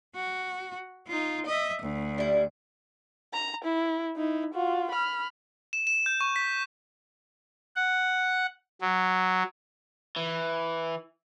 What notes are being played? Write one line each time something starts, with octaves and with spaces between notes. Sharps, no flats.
F#4
D#4 F4
D#5 E5
D2
G3 E4
A#5
E4
D#4 E4
F4 F#4
B5 F6
E7
E7
G6
C#6
B6
F#5
F#3
E3